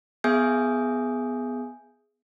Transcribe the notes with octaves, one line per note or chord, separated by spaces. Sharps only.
B3 G#4 E5 G#5 D#6 G6